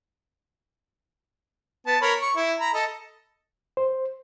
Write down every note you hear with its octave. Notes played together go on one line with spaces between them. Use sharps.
B3 A5
A#4 C#5 B5
C#6
E4
A#5 B5
A4 D#5
C5